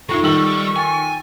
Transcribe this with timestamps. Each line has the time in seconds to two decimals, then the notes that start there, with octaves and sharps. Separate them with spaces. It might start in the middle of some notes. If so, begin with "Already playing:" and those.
0.09 B3 D#4 F4 G#4 A4 C#6
0.24 D#3 G3 C#6 E6 F#7
0.76 G5 G#5 A6